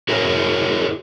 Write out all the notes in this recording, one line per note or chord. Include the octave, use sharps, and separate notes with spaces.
E4 F#4 G#4 A#4 C#5